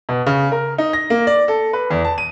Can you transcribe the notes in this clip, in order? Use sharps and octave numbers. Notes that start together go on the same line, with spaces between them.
B2
C#3
A#4
D#4
A#6
A#3
D5
A4
B4
E2
A5
D#7